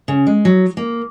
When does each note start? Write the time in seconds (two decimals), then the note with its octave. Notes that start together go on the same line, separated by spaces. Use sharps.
0.08 C#3
0.27 G#3
0.45 F#3
0.77 A#3